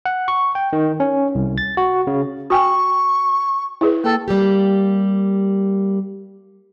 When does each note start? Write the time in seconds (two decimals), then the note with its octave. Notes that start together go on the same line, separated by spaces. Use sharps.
0.06 F#5
0.28 C#6
0.55 G5
0.73 D#3
1.00 C#4
1.35 C2
1.58 A6
1.77 F#4
2.07 C#3
2.50 F#4 G5 G#5 C#6
3.81 E4 G#4 B4
4.04 A#3 A4 G5
4.28 G3 A#3 G4